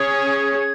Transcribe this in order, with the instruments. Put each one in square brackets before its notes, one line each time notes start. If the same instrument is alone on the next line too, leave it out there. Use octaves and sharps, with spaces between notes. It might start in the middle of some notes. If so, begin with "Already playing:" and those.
Already playing: [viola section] C#4 G#4 C#5 [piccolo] G#6